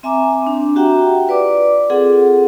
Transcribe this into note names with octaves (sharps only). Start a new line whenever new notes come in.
C4 E5 G#5 A#5 D6
C4 D4
F#4 G4 E5 F#5 G5 A#5
F4 B4 D5 D6
C4 F4 G#4 A4 F#5